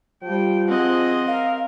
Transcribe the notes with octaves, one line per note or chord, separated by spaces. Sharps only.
F3 G3 G5
C4 G#4 D#5 F#5
A#4 F5